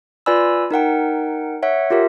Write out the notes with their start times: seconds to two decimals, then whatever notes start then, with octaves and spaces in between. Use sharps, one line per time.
0.26 F4 B4 D5 G#5 B5 E6
0.71 D#4 A#4 F#5 G5
1.63 C#5 E5 F#5
1.90 F4 G4 A#4 E5